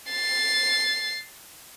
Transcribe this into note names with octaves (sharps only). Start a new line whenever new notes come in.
A6 C7